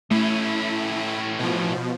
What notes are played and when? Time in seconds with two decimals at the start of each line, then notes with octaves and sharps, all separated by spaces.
0.11 A2 A3 C#4 E4
1.39 B2 F3